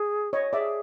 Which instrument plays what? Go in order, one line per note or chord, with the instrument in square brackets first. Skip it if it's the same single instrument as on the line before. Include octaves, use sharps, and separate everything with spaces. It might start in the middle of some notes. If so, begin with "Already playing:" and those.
Already playing: [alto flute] G#4
[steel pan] C#5 D#5
[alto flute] G#4 [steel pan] D5 E5